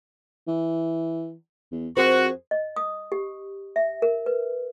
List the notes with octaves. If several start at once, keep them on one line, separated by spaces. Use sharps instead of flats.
E3
E2
F2 F#4 G#4 A#4 C5
D#5
D#6
G4
E5
A#4
B4